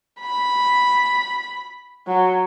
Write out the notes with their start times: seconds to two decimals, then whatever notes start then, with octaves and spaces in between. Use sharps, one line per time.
0.21 B5
2.07 F#3